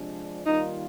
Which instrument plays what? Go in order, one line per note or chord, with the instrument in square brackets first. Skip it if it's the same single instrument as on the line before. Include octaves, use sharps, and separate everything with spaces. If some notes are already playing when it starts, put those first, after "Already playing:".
Already playing: [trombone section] C3 F3 G#3 D4
[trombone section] D#3 G3 A#3 F4 [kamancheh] D#4